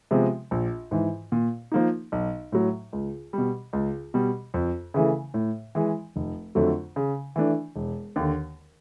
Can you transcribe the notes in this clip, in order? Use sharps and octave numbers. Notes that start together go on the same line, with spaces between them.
C3 F3 G#3 B3
A#1
G#2 E3
A#2
F3 A#3 D#4
B1
A2 F#3
C#2
B2 G3
C#2
B2 G3
F2
C#3 E3 A3
A2
E3 G#3
F1
F2 D3 F#3 A3
C#3
E3 A3 D4
E1
D#2 D3